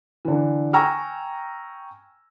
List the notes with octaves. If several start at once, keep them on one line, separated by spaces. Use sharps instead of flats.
D3 E3
G5 G#5 A#5 C#6 E6 F6